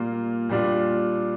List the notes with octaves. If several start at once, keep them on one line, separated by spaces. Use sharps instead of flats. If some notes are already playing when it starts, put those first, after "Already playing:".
Already playing: A#2 G3 A#3 F4
A#2 G3 D4 F4